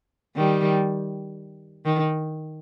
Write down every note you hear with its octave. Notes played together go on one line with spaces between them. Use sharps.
D#3 G3
D#3